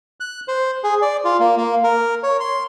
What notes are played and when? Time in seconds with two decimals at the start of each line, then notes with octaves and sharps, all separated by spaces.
0.20 F#6
0.48 C5
0.83 G#4
1.02 D5
1.24 F4
1.39 A#3
1.57 A#3
1.84 A#4
2.23 C#5
2.40 C6